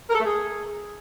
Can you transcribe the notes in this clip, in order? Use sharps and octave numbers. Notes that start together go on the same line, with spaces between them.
A#4
A4
A3
G#4